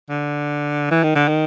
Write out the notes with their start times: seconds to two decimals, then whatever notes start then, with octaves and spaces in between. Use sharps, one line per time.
0.10 D3
0.91 E3
1.03 D#3
1.15 D3
1.28 D#3